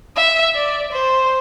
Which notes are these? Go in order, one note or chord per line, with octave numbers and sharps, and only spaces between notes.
E5
D5
C5